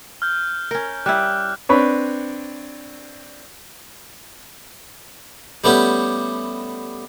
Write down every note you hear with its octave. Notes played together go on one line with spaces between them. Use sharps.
F6 G6
C#4 A#4
G3 E4 D6 F#6
C4 D4 B4 C#5
G3 A3 B3 C#4 G4